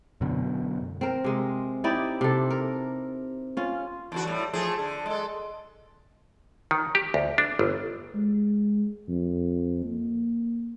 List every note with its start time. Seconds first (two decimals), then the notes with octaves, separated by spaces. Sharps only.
0.21 F#2 B2 D3
1.01 C4 A#4
1.24 C3 G#3
1.84 D#4 E4 G4 D5
2.21 C3 A4
2.50 A#4
3.57 C#4 F4
4.12 E2 D3 F#4
4.25 A2 G3
4.53 F3 A3 G#4
4.79 D3
5.06 G#3 A4
6.71 D#3
6.95 G4
7.14 D2
7.38 D4
7.59 G1
8.15 G#3
9.09 F2
9.85 A#3